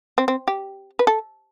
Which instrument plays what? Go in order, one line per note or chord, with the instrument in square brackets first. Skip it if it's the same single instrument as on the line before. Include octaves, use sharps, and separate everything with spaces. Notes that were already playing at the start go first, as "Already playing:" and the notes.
[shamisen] C4
C4
G4
B4
A4